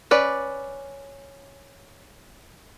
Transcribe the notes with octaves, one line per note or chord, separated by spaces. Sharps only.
C#4 B4 D5